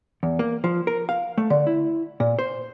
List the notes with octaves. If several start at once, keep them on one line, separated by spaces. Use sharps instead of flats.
E2
A#3
F3
A#4
F5
A3
D3
E4
A#2
C5